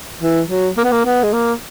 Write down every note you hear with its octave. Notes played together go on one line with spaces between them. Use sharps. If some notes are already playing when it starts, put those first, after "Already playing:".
E3
F#3
A#3
B3
A#3
B3
G#3
A#3